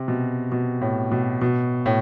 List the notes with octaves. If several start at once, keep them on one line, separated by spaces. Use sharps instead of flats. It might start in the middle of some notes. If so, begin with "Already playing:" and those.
Already playing: C3
B2
B2
A2
B2
B2
A2